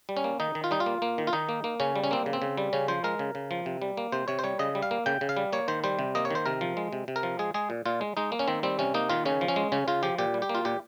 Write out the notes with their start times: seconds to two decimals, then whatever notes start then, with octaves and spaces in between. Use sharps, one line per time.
0.09 G3
0.17 C#4
0.24 A#3
0.40 D#3 D#4
0.55 D#3
0.64 F4
0.71 G3 D#4
0.80 F4
0.86 A#3
1.02 A#3
1.18 D#3
1.27 F4
1.33 D#3 D#4
1.49 A#3
1.64 A#3
1.80 C#3 C#4
1.96 G3
2.04 C#4
2.11 A#3 C4
2.26 C#3
2.33 C4
2.42 C#3
2.58 G3
2.73 C#3 C#4
2.88 F3 C5
3.04 G#3 A#4
3.19 C#3
3.35 C#3
3.51 F3
3.66 C3
3.82 G3
3.97 A#3
4.12 C3 C5
4.28 C3 C#5
4.39 C5
4.44 G3 C#5
4.59 C#3 D#5
4.75 G3
4.82 F5
4.91 A#3
5.06 C#3 G5
5.21 C#3
5.29 F5
5.37 G3
5.53 A#3 C#5
5.68 D#3 C5
5.84 G3 C5
5.99 C3
6.15 A#3 D#5
6.25 C#5
6.30 D#3 C5
6.46 C3 A#4
6.61 F3
6.77 G#3
6.93 C3
7.08 C3
7.16 A#4
7.23 F3
7.39 G#3 G#4
7.54 G#3 G#4
7.70 A#2
7.86 A#2 F4
8.01 G#3
8.17 G#3 D#4
8.32 A#3
8.39 C#4
8.48 D#3 C4
8.63 G3 C4
8.79 C3 C#4
8.94 A#3 D#4
9.10 D#3 F4
9.25 C#3 C#4
9.41 F3
9.48 C#4
9.56 G#3
9.72 C#3 C#4
9.88 C#3 F4
10.03 F3 G4
10.18 A#2 G4
10.34 G3
10.42 G4
10.49 A#3
10.55 F4
10.65 A#2 G4